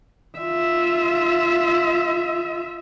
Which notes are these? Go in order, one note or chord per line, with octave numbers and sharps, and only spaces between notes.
F4 E5